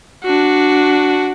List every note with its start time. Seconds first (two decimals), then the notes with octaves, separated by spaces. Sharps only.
0.24 D4 F#4